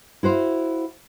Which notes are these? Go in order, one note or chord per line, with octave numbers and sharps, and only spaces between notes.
E4 F#4 C5 F5